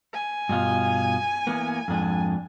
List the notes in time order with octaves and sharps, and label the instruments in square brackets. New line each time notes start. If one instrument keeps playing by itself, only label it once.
[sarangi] G#5
[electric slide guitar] G2 B2 F4
E3 A#3 B3
F2 G#2 D4